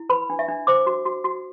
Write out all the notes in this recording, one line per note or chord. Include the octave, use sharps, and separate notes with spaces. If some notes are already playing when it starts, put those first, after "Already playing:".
Already playing: E4
B4 B5
D4
E5
D4
C5 D6
F#4
F#4
F#4